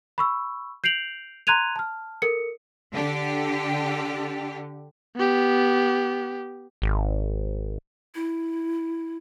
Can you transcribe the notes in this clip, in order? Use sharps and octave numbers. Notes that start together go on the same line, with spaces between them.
B5 C#6 E6
G6 C7 D7 F7 F#7
A#5 C6 F#6 G#6 D#7 F7
A5 F6
A4 A#4 C#7
D3 G4
B3 G4
G#1
E4